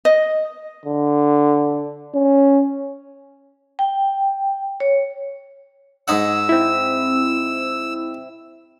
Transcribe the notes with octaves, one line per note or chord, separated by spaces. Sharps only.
D#5
D3
C#4
G5
C#5
G#2 D#4 F#5 E6
C4 E4